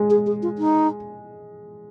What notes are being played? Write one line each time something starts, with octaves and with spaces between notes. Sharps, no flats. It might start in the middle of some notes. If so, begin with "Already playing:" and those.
Already playing: G#3
G#4
G#4
F4
D#4